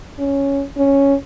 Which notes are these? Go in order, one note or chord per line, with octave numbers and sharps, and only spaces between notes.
C#4
C#4